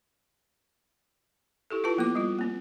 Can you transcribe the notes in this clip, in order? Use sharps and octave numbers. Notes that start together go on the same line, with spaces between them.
E4 G4 A4
E4 F4 B4 A5
F3 A#3 B3 D6
G3 A#3 F4
A#3 C4